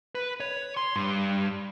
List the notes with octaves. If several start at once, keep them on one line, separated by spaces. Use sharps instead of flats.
B4
C#5
C6
G2